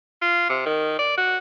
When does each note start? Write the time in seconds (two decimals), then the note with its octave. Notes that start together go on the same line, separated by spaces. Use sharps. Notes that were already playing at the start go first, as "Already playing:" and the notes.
0.22 F4
0.49 C3
0.66 D#3
0.99 D5
1.17 F#4